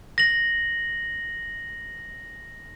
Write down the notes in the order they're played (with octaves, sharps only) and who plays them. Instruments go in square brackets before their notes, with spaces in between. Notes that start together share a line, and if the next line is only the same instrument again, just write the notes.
[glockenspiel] A#6 F#7